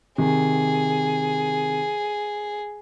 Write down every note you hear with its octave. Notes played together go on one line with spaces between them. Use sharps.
C3 D#3 G#4